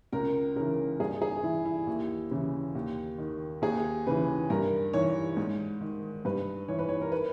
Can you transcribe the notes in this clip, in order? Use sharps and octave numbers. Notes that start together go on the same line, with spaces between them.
C#2 A#4
C#3 E3 A#4
G2 G#4
G#4
E3 E4
E4
D#2
C#3 E3
D#2
D#3
D#2 G#4
C#3 E3 B4
G2 A#4
E3 C#5
G#2
D#3
G2 B4
E3 C#5
B4
C#5
A#4
B4